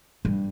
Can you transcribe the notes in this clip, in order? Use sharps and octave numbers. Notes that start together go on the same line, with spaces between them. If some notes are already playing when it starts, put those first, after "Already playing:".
G2